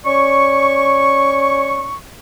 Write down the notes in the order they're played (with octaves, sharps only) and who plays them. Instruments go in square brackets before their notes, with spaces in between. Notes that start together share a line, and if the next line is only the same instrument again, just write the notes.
[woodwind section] C#4 C#5 D5 C#6